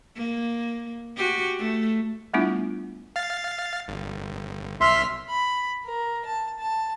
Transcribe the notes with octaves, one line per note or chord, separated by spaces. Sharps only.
A#3
F#4 G4
A3
G3 A3 B3 D4 E4 F4
F5 A6
G1
B1 E5 C6 F6 B6
B5
A#4
A5
A5